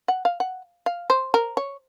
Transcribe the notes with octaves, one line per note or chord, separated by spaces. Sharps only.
F#5
F5
F#5
F5
C5
A#4
C#5